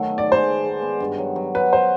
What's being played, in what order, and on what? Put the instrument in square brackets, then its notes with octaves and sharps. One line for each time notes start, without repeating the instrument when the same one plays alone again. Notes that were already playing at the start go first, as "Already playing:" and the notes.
Already playing: [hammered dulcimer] D#3 F#3 A3
B3
[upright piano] D5
[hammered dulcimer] G#3 [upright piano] C5
[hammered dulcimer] B3
G#3
B3
G2
F#3
F#3
[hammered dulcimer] F#3 [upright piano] B4
[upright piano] C5